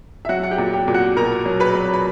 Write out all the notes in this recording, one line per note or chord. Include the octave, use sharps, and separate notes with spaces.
E5
F#3 F#4 F#5
F#5
G4 G5
A#2
G4 G5
A#2
F#4 F#5
B2 A#4 A#5
F#3
B4 B5
F#3
B5